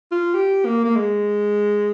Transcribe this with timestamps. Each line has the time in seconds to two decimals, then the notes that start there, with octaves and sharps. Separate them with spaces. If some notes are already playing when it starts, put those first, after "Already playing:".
0.12 F4
0.35 G4
0.65 A#3
0.85 A#3
0.96 G#3